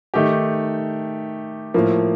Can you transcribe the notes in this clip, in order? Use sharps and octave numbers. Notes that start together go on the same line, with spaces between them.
D#3 A3 D#4 G4
A2 F3 A#3